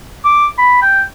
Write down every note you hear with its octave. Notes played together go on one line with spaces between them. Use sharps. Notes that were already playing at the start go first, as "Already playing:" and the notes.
D6
B5
G5